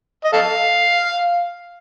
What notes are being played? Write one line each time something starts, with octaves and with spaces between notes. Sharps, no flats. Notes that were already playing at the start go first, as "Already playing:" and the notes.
D#5
A4 F5